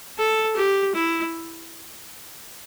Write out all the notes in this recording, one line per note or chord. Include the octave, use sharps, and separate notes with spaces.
A4
G4
E4